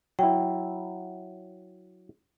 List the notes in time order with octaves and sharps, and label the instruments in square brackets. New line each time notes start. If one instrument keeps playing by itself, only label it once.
[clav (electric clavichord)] F#3 E4 [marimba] G5